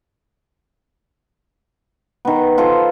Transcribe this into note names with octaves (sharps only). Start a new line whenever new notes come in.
D#3 B3
F3 F4 A4 C5